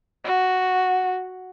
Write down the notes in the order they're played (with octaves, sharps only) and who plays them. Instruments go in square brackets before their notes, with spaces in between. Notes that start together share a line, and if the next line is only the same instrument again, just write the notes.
[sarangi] F#4